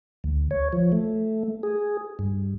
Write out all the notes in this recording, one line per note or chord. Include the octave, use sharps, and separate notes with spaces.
D2
C#5
F3
A3
G#4
G2